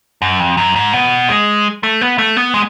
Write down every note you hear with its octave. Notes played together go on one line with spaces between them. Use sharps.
F#2
F2
F#2
G#2
B2
G#3
A3
B3
A3
B3
G#3